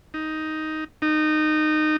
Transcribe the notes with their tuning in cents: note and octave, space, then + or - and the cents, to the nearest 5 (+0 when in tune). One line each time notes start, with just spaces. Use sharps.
D#4 +5
D#4 -20